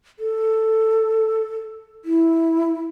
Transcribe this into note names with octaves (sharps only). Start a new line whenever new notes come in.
A4
E4